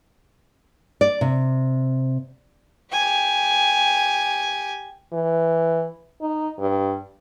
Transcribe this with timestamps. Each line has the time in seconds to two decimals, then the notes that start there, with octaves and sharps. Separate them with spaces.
1.01 D5
1.21 C3
2.92 G4 G#5
5.13 E3
6.21 D#4
6.59 G2